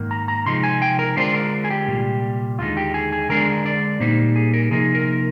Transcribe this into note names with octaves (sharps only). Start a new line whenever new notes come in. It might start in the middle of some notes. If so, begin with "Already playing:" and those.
Already playing: G#2 D#3 A#3
A#5
A#5
C3 F3 G#3 C4 D#4 C6
G#5
G5
A#4
D3 G#3 D4 F4 C5
A#4
G#4
G4
C2 A#2 G3
D#2 D3 G#3 D#4 F4
G4
G#4
G#4
D3 G#3 D4 A#4
D5
A#2 G3 A#3 D#4 C5
G#4
A#4
C3 F3 A#3 D#4 G#4
A#4